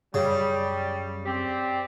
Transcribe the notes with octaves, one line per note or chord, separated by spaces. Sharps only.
F#2 C#3 G3
C4 G4 D5